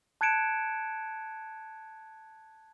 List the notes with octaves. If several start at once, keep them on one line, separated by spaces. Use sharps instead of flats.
A5 F#6 G#6 C#7 D7 E7